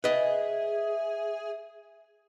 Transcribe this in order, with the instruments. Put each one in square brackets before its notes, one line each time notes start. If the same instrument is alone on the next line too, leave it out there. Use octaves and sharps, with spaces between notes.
[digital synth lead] G#4 [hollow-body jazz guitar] B4 D#5 [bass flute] E5